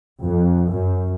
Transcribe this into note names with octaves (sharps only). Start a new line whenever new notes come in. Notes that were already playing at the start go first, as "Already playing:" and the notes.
F2
F#2